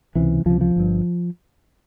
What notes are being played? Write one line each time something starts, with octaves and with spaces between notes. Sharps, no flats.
C#2 C3 E3
C#2 C3 F3
F3
G1 G2